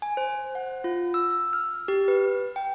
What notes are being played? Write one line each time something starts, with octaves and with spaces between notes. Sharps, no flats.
G#5
C5
F#5
F4
E6
E6
F6
G4
B4
G5